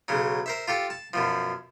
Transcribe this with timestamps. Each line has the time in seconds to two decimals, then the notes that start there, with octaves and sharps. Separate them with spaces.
0.08 B1 C#3 F#3
0.46 A#4 C5 E5
0.68 F4 G4 A4
0.90 A5
1.13 F#2 B2 F3